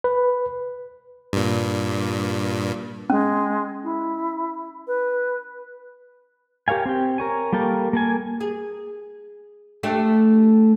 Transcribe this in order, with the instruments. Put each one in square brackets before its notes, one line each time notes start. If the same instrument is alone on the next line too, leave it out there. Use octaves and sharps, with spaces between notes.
[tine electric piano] B4
[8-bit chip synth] G2 A#2
[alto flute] G#3 [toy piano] C#4
[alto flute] E4
B4
[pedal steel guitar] G4 A#4 C#5 F5 G#5
C4 G4
A#4 C#5 G#5
G3 A#3 G4 A4 A#4
A#3 A4 G#5
[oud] G#4
A3 D4 G4